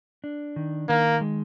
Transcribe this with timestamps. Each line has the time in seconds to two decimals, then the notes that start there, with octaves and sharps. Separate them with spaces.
0.24 D4
0.56 D#3
0.89 D#3 A#3
1.21 G#3